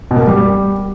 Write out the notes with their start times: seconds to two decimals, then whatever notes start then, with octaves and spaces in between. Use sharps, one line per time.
0.11 B2
0.16 A#3
0.22 B2
0.27 G3